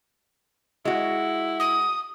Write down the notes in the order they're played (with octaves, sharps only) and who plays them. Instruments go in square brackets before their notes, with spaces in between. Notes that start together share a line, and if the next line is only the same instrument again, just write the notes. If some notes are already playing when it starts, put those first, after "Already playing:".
[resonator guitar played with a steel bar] G#3 F#4 [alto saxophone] E4
[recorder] D#6